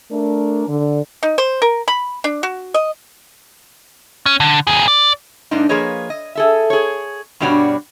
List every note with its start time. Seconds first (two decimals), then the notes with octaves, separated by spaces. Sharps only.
0.12 A3 D4 A#4
0.68 D3
1.23 D#4
1.38 C5
1.62 A#4
1.88 B5
2.24 D4
2.43 F#4
2.74 D#5
4.26 C#4
4.40 D3
4.67 D#2 G#4
4.88 D5
5.51 G#2 A#3 D4 D#4
5.69 F3 A#3 G#4 B4 C#5 D#5
6.10 D#5
6.35 G#4 A4 E5
6.70 G#4 C#5
7.40 G2 B2 G3 D4 F#4 C#5